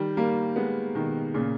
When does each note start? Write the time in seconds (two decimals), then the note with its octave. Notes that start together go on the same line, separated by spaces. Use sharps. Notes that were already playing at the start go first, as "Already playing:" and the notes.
Already playing: D#3 G3
0.17 G3 A#3
0.56 G#3 B3
0.95 B2 D#3
1.34 A#2 C#3